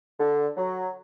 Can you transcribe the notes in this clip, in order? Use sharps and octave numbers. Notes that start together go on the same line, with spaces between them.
D3
F#3